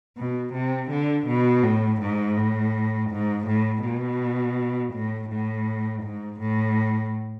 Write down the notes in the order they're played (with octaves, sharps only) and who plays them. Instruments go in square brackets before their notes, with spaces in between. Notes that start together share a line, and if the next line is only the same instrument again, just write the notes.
[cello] B2
C3
D3
B2
A2
G#2
A2
G#2
A2
B2
A2
A2
G#2
A2